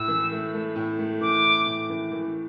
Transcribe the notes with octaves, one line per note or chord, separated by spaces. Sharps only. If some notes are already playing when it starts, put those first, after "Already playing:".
Already playing: A2 E6
E3
A3
A3
A2
A3
E3 D6
A2
A2
E3
E3